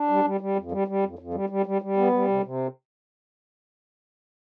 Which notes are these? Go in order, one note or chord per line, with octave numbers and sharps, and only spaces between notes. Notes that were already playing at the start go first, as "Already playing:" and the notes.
Already playing: D4
G3
G3
G3
F2
G3
G3
F2
F2
G3
G3
G3
G3
B3
G3
C3
C3